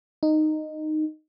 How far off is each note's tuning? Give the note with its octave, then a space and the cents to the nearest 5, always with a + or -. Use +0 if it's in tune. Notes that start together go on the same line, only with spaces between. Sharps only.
D#4 -10